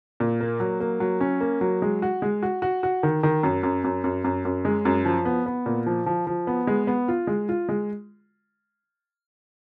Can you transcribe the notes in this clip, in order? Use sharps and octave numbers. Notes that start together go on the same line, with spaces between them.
A#2
A#3
F#3
A#3
F#3
C#4
A#3
F#3
G#3
F#4
G#3
F#4
F#4
F#4
D#3
D#3
F#2
F#2
F#2
F#2
F#2
F#2
G#3
F#2
F3
B3
B3
A#2
F3
F3
F3
B3
G#3
B3
F4
G#3
F4
G#3